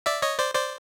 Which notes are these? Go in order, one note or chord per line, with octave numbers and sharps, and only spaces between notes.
D5 E5
C#5 D#5
C5 D5
C5 D5